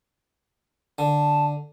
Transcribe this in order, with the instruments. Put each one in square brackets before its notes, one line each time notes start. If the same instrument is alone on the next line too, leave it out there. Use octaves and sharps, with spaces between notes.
[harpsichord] D3 [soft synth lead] A5